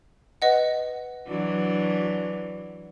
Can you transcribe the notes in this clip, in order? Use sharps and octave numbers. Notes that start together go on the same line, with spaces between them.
B4 D#5 F#5
E3 F#3 D4